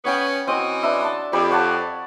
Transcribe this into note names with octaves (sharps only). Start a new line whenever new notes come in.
B3 C#4 C#5 F#5 G5
E3 C4 C#4 F#4 D#5
D4 B4 E5
A5 C6
F2 G4 B5 D#6
C#5 F#5 A5